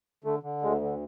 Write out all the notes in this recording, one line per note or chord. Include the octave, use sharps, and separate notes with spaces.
D3 A3
D3
D2 G#3
D3